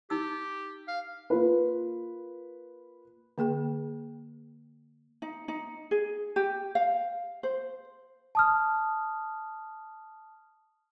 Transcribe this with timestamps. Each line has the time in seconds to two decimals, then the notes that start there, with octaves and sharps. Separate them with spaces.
0.10 D#4 G4 E6
0.88 F5
1.30 A#3 F4 B4
3.38 D3 A#3 G#4 G5
5.22 D#4
5.48 D#4
5.91 G#4
6.36 G4
6.75 F5
7.43 C5
8.35 A5 D#6 F6